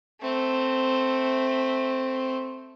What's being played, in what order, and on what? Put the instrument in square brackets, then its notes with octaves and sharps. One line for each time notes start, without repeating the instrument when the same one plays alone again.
[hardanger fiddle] A3 C4